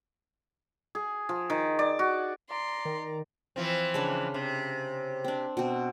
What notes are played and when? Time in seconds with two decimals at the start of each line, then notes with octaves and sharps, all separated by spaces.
0.95 G#4
1.29 F3
1.50 D#3
1.79 D5
1.99 F#4
2.50 D5 A#5 C6
2.85 D#3
3.56 E3 F3 C4
3.94 C#3 D4 B4
4.34 C3
5.24 C4 D4
5.57 B2 C4